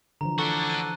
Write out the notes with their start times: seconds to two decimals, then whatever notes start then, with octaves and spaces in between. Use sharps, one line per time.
0.21 D3 E3 F3 A#5
0.38 D4 F#4 A4 C#6
0.70 F#6 D#7